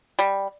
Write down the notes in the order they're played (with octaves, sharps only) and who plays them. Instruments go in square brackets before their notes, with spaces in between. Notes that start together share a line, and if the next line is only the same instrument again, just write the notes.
[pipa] G3